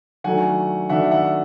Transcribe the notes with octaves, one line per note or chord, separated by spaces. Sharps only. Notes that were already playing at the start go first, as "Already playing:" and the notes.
D#3 F#3 A3 D4 F#5 G#5
D#3 F#3 A3 D4 E5 F#5
E5 F#5